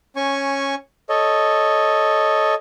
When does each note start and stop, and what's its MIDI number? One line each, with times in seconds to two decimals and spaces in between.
0.16 0.75 61
0.16 0.75 80
0.16 0.75 85
1.09 2.55 69
1.09 2.55 73
1.09 2.55 75